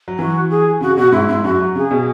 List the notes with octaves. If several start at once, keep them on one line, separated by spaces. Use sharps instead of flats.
F#3
E3 F#4
G#4
C#3 F#4
B2 F#4
G#2 E4
G#2 E4
F#2 F#4
F#3
C#3 G#4
B2